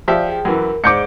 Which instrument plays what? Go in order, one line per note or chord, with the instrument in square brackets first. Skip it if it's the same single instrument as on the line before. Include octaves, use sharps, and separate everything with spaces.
[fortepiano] F3 G4 E5 [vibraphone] D5 F5 G5
[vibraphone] G#4 G5
[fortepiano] F#2 E3 [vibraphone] A#4
[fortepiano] G#2 [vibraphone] G#4 C5 D5 [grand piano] D6 G6 C#7